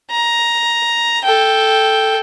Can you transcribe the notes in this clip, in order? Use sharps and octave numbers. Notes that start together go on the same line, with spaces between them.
A#5
A4 G5